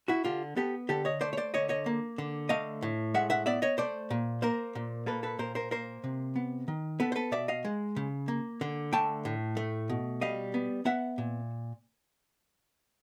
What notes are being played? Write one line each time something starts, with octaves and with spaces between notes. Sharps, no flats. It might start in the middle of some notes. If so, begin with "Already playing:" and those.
E4 F#4
D3 F4 G4
B3 G4 A4
D3 G4 A4
C#5 D#5
A3 C5 D5
C#5
C5 D5
D3 C#5 D#5
C#5 D#5
A#3
D3
A3 D#5 F5
A2
G#3 E5 F#5
E5 F#5
B3 D5 E5
C#5 D#5
A3 C5 D5
A#2
A#3 A#4 C5
A#2
A#3 A4 B4
A4 B4
A#2 A#4 C5
A#4 C5
A#3 A#4 C5
C3
B3
D#3
B3 A4 B4
C5
A4 B4
B2 D5 E5
D#5 F5
G#3
C#3
A#3
D3
A3 G5 A5
A2
A3
B2
G3 D#5 F5
B3
B3 E5 F#5
A#2